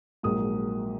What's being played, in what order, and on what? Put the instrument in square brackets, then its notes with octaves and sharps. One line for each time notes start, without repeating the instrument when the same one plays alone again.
[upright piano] A#1 G#2 F#3 A#3 D#6